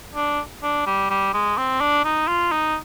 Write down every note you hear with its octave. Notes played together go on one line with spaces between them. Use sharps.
D4
D4
G3
G3
G#3
C4
D4
D#4
F4
D#4